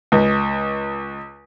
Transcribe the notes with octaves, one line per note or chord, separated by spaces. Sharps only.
C#2